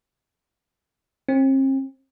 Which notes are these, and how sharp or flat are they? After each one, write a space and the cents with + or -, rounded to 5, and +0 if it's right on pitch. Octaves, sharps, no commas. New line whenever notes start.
C4 +40